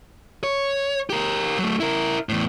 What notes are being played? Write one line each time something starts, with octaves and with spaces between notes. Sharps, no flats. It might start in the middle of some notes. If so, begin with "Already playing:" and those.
C#5
G4 A#4
F#3 A3
E4 A#4
E2 A2